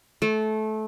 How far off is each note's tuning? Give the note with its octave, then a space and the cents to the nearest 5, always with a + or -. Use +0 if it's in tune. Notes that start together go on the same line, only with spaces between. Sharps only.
A3 -20